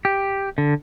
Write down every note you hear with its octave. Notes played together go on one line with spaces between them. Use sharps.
G4
D3